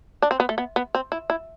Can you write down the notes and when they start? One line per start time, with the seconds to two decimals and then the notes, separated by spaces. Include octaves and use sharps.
0.22 D4
0.31 C4
0.40 B3
0.49 A3
0.58 B3
0.76 B3
0.95 C4
1.12 E4
1.30 E4